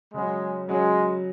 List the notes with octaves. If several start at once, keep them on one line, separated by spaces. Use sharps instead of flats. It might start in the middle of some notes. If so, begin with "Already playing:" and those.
C#3 F#3 G#3 C#4 F#4
C#3 F#3 G#3 C#4 F#4